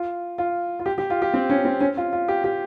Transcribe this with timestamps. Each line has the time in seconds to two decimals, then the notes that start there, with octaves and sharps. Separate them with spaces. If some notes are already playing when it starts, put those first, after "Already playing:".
Already playing: F4
0.38 F4
0.79 F4
0.86 G4
0.98 G4
1.10 F4
1.22 G4
1.34 C4
1.50 C#4
1.65 C4
1.80 C#4
1.97 F4
2.13 F4
2.28 G4
2.44 G4